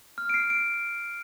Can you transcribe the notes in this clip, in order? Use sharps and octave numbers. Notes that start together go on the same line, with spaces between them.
F6
D7
C7
D7